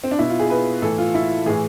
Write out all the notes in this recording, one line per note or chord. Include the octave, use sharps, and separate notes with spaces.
C4
D4
B2 E4
F4
G#4
B4
A2 E3 A4
F4
E4
A2 E3 G#4